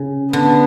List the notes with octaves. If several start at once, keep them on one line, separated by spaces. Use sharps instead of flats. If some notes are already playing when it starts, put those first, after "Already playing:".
Already playing: C#3
D3 B3